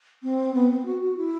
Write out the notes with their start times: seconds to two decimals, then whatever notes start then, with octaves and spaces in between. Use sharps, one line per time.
0.23 C4
0.54 B3
0.71 C4
0.85 F#4
1.01 F#4
1.17 E4